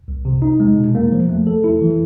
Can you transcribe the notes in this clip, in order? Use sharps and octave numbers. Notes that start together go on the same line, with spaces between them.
C2
C3
D#4
G#3
B2
A#3
F3
A3
A4
E4
E3